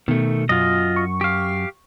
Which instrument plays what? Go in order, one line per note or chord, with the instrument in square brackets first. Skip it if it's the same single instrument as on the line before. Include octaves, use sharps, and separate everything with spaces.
[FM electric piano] B2 [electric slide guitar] D#3 A3
[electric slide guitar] F#2 [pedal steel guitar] F4 D#5
[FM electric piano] C#6
[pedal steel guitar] G4 F5